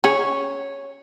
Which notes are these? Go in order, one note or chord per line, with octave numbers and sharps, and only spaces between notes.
C#4 G#4 C#5